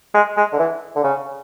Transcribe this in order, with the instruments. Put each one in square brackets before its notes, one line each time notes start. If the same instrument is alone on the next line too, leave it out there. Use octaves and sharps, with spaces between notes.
[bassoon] G#3
G#3
D3
E3
D3
C#3